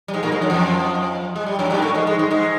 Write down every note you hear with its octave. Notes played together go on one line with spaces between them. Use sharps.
G3
G#2 G#3
A#2 A#3
G#2 G#3
F#2 F#3
F2 F3
G#3
G3
F#2 F#3
G2 G3
A#3
A2 A3
G#2 G#3
G#2 G#3
G#2 G#3
G#2 G#3